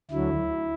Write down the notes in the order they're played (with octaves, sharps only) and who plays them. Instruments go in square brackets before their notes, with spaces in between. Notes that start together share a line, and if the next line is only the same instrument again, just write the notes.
[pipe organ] D2 D3 F#3 E4